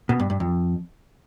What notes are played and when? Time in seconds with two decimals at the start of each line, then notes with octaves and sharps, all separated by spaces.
0.09 B2
0.20 G2
0.30 G2
0.40 F2